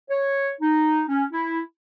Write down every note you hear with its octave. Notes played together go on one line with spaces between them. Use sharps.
C#5
D#4
C#4
E4